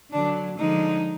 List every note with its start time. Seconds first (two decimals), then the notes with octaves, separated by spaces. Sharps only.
0.12 D3 F#3 D4
0.58 D3 F3 G#3 D#4